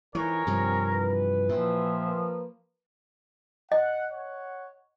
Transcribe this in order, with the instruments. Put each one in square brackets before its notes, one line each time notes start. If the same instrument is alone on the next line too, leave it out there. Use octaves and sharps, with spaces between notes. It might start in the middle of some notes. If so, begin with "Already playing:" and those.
[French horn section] F2 G#2 [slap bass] E3 [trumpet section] G#4 C#5 [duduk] A#4
[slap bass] G2 C3 F3 [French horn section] C4
[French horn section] E3 B4
[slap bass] A#2 [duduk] F3 [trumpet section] C4 G#4 E5
[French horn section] A#3 B4
[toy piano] D#5 [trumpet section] F#5
[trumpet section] C#5 F#5